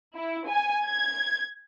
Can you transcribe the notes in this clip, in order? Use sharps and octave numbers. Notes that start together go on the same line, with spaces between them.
E4
G#5
G#6